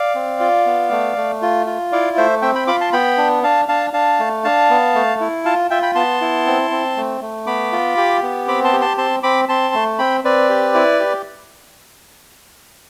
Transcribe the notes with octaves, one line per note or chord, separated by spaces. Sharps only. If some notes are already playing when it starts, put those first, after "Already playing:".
Already playing: D5 F5
C4
F4
B3
A3
A3
F4
F4
E4 D5 F5
A3 C5 E5
C4 E5 G5
G5 B5
F4 B5 D6
A5 C6
B3 G5 B5
D4
D4 F5 A5
D4 F5 A5
D4 F5 A5
A3
D4 F5 A5
B3
A3
E4
F4 F5 A5
F4 E5 G5
G5 B5
B3 A5 C6
E4
C4
C4
A3
A3
B3 B5 D6
F4
G4
B3
C4 B5 D6
A5 C6
G4
A5 C6
C4 A5 C6
C4 B5 D6
C4 A5 C6
A3
C4 G5 B5
C4 B4 D5
G4
E4
G4